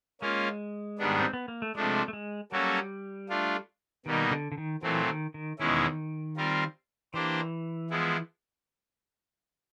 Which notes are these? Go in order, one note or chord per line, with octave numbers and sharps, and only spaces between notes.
G#3 A#3 C#4 F4
G#2 D#3 G3 B3 D4
C4
B3
A#3
A3
C3 F3 G#3 A3 D4
A3
G#3
F#3 G3 A#3 C#4 F#4 A4
A3 D4 F4
B2 D#3 G3 A#3 D#4
D3
D3
D#3
A#2 E3 F#3 A3 C4
D#3
D#3
E2 B2 D#3 G#3 C#4 E4
G3 C4 F4 A#4
E3 A#3 D4 G4 C5
F3 G#3 B3 E4